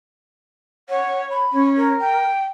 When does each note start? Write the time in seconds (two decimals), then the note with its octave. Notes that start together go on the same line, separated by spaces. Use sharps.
0.89 C#5 F#5
1.30 B5
1.53 C#4
1.77 A#4
2.00 G5